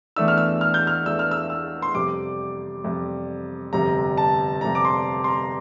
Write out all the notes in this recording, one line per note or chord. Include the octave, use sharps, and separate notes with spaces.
E2 E3 A3 D4 E6
F6
E6
F6
G6
F6
E2 E3 A3 D4 E6
F6
E6
E6
C6
F2 C3 G3 D6
F2 C3 G3
G1 F2 C3 G3 A#5
A5
G1 F2 C3 G3 A#5
D6
C6
C6
A#5